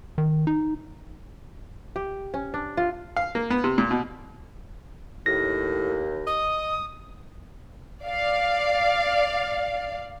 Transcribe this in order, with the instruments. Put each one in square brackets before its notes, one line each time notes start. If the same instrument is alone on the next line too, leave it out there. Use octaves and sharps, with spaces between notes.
[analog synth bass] D#3
D#4
[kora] G4
C#4
D4
F4
[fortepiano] F5
A#3
B3
C3
A#2
B2
[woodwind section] D#2 [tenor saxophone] A2 [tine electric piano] A#6
[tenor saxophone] D#5 [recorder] D#6
[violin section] D5 F5